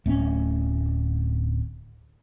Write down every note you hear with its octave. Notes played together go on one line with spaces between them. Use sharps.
D1 A3 C4 C#4